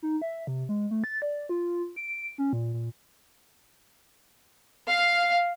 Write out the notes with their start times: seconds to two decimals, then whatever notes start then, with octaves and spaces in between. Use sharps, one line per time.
0.03 D#4
0.22 E5
0.47 C3
0.69 G#3
0.91 A3
1.04 A6
1.22 D5
1.49 F4
1.96 D7
2.38 C#4
2.53 A#2
2.74 A#2
4.89 F5